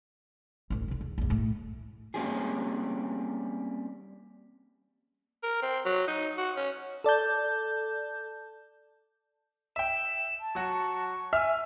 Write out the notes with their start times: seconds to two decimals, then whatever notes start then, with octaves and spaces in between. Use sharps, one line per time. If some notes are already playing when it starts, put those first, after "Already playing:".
0.70 A1 D2
0.88 C2 D3
1.01 E2
1.18 A#1 F2
1.30 A2 A3
2.14 G3 A#3 C4 C#4 G4 G#4
5.43 A#4
5.62 C4
5.85 F#3
6.08 D#4
6.38 F#4
6.56 C#4
7.04 A4 D5 A5 G6
9.76 E5 G5 E7
10.40 A5
10.55 F#3 F#4 C#6
11.33 E5 G#5 F6